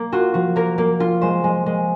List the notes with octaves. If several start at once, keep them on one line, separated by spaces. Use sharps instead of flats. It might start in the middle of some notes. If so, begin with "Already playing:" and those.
Already playing: A#3
F4 F#4
F3 F#4
A#3 A#4
A#3
F4
G#3 C5
G#3
G#3